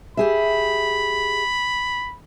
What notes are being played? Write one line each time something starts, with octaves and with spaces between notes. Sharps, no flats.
G4 G#4 E5 B5